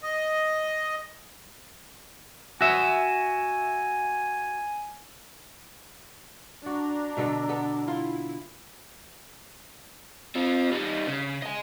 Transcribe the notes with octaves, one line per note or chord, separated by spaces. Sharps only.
D#5
F#4 E5 G#5
D4 F#4 A#5
B2 D3 A4
B3 A4
E4 F4
C4 F4
G3 D#4
C#3
D#5 G#5